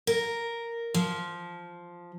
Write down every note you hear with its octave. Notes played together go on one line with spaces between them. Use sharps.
A#4
F3